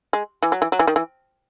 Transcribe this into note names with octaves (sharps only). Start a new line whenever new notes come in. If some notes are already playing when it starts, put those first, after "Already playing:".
G#3
E3
F#3
E3
F#3
E3
D#3
E3